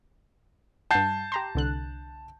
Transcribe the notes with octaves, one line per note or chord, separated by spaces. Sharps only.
G2 F#5 A5 G6 C7
G4 A#5 C6
C2 D3 F#6